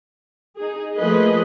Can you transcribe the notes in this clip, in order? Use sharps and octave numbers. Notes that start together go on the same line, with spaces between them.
D#4 G#4
F3 A3 A#3 G#4 B4 D#5